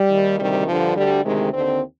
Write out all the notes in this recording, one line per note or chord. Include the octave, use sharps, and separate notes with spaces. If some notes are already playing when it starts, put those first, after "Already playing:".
Already playing: G3
D#2 D#3
D2 C3 D#3 G3
G2 D3 F3
D2 D3 G3
D2 C3 D#3 G#3
D#2 D3 C4